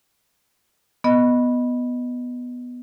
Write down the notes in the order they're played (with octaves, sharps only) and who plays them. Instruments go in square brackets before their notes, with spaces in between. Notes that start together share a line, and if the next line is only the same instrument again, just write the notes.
[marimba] B3 D#5